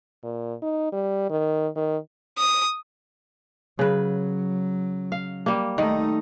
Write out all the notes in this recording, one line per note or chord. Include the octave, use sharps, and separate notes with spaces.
A#2
D#4
G3
D#3
D#3
D#6
C#3 F#3 B4
F5
G3 A#3
D#3 A3 D#4